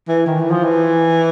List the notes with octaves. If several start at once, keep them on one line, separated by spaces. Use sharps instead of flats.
E3
D#3
E3
F3
E3